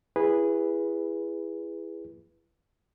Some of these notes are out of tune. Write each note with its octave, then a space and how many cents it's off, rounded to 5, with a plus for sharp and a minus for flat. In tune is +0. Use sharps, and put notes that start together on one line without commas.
E4 +20 G#4 -15 B4 -10